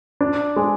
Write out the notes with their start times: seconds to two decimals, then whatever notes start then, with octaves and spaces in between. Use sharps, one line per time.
0.21 D4
0.56 G#3